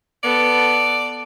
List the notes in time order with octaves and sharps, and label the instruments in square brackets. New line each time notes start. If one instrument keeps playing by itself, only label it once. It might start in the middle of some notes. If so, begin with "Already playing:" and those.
[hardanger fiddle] B3 A4 [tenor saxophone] D5